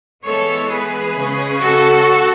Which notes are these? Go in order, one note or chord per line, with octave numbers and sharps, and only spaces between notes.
E3 G#3 B3 A4 C#5
G#4 B4
C#3 G#3 C#4
F#4 A4